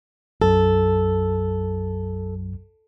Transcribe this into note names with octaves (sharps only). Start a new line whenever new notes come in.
B1 F#2 F#3 A4